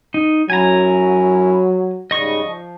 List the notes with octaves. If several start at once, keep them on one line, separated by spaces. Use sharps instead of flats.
D#4
F#2 F#3 C#4 E4 G#5 A#5
G#2 C#3 G3 D#5 C#6
F3